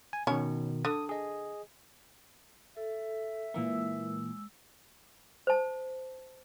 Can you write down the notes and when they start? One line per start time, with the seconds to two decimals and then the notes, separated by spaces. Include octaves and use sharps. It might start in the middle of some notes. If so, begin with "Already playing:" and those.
0.13 G#5
0.27 B2 D#3 C#4 C#5
0.85 D3 D#6
1.09 G#4 D#5
2.77 A4 E5
3.54 A#2 E3 G#3 A#3 E6
5.47 C5 A5